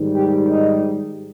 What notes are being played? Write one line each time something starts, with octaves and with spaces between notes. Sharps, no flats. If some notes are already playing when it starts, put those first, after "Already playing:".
Already playing: G#2 D#3 G3
G4
D#4